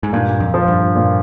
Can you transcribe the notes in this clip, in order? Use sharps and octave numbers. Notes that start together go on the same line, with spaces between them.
G#2
G2 A#2
F2
F3
G2
A#2